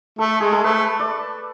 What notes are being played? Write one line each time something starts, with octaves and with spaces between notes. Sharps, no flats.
A3 A4
G#3 G#4
A4
A3 B4
D5